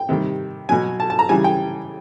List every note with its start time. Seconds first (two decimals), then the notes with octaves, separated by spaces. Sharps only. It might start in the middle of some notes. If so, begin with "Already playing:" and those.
Already playing: G5
0.09 C3 D#3 G3
0.69 B2 F#3 G#5
1.00 A5
1.10 A5
1.19 A#5
1.29 C#3 E3 G3 G#5
1.44 G5